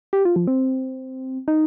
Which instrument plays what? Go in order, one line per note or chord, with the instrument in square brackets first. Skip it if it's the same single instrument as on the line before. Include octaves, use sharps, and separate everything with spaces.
[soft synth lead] G4
F4
F3
C4
D#4